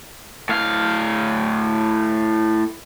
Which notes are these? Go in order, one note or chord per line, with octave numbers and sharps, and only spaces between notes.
A2 F5